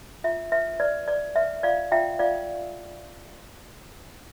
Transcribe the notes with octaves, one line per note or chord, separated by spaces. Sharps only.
F4 E5
B4 E5
B4 D5
B4 D5
B4 E5
F4 D5 F5
F4 E5 G5
F4 D5 F5